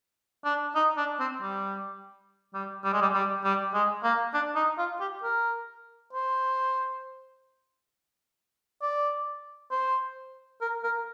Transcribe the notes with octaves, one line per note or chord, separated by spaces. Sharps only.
D4
D#4
D4
C4
G3
G3
G3
G#3
G3
G3
G3
G#3
A#3
D4
D#4
F4
G4
A#4
C5
D5
C5
A#4
A#4